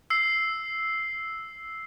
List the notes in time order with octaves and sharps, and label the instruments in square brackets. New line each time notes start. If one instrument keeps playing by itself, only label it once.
[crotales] E6 C7